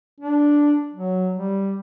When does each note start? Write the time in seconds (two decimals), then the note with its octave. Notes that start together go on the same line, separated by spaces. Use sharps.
0.20 D4
0.93 F#3
1.36 G3